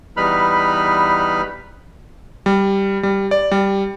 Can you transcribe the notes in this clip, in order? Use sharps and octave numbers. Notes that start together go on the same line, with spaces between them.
E2 G3 D#4 B4 B5 F6
G3
G3
D5
G3